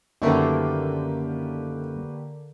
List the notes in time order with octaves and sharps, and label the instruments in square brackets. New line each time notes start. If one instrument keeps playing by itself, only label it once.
[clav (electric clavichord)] F#2 A3 [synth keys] D3 A#3 [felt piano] D#3 [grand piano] G4 B4 C#6